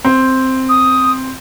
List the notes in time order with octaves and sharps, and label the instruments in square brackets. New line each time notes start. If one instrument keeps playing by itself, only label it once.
[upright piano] C4
[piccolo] D#6